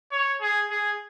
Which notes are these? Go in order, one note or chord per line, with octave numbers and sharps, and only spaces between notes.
C#5
G#4
G#4